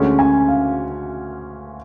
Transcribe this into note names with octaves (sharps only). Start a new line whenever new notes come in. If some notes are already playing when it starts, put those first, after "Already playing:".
Already playing: D2 D3 G#3 C#4
G#5
F5